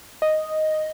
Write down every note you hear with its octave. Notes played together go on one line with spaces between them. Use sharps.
D#5